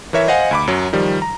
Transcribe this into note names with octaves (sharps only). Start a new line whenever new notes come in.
E3 A#4 C#5 E5
C5 D#5 F5 F#5 G#5
D2 B5 D6
F#2 F#3
D#3 F3 G3
A#5